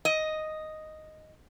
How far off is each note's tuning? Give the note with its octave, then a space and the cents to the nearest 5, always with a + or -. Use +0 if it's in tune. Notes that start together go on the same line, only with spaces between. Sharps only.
D#5 +0